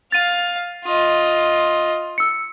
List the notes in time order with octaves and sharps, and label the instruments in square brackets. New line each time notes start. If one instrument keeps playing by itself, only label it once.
[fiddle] F5 [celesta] A6 D#7
[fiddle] F4 D#5
[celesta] E6 C#7